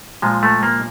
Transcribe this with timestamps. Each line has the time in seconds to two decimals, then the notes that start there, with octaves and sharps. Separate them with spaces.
0.22 A#2 F3 G#3
0.43 A3
0.63 A#3